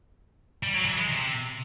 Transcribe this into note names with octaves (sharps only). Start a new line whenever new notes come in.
G3
F#3
E3
G#3
C3